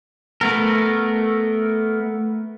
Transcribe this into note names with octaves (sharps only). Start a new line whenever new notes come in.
A3 B3 A#4